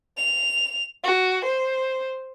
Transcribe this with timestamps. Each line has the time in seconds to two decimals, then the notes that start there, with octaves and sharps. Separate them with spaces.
0.17 F7
1.04 F#4
1.44 C5